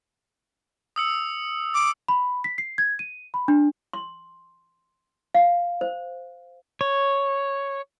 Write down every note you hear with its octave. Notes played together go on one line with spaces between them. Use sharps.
D#6 E6 C#7
D6
B5
B6
C7
G#6
D#7
B5
D4
C6
F5
C5
C#5